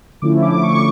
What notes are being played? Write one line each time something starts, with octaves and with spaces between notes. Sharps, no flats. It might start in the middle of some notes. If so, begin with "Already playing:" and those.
D3 F3 A3 C#4 E4 D6
D6
C#6